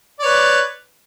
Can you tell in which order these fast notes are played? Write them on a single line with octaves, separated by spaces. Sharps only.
D5 C#5 B4